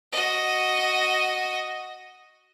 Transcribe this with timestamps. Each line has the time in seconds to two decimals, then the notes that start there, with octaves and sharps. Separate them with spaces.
0.12 F#4 D#5